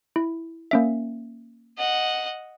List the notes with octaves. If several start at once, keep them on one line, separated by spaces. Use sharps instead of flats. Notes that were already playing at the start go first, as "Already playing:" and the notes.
E4
A#3 C#4 E5
D#5 F#5